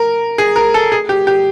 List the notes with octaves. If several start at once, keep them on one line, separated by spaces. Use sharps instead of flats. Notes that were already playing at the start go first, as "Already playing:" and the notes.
Already playing: A#4
G#4
A#4
A4
G#4
G4
G4